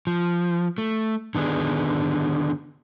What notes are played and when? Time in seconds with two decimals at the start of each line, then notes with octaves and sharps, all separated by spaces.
0.07 F3
0.78 A3
1.35 D3 D#3 B3 D4 G#4